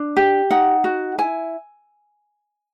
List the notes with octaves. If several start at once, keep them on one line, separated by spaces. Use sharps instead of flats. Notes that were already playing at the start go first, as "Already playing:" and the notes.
Already playing: D4
G4
D#4 F#5
F#4
E4 G#5